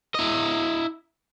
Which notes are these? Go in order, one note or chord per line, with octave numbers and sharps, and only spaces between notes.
E4 D#5